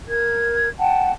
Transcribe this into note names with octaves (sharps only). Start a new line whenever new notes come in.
A#4 G#6
F#5 G5 A5